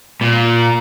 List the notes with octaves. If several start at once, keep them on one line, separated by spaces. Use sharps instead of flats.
A#2